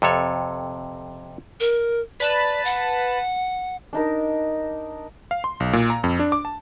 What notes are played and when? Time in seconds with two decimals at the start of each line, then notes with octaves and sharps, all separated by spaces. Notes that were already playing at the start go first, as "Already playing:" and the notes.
0.02 F2 C3 A4 C#5
1.60 A#4
2.20 B4 D5 A5 B5
2.65 F#5
3.93 D4 D#4 A#4
5.31 F5
5.44 C6
5.60 B1
5.73 A#2
5.90 A#5
6.04 F2
6.19 D4
6.32 D6
6.45 A5